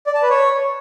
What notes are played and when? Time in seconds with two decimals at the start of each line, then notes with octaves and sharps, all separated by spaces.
0.07 D5
0.15 A5
0.22 B4
0.30 C#5